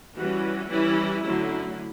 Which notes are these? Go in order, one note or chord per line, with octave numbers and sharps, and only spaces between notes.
E3 G3 C#4 F#4
E3 G3 C#4 E4
D3 F#3 A3 C#4 E4